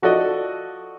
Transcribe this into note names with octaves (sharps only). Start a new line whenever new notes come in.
F3 F#4 A4 D5 D#5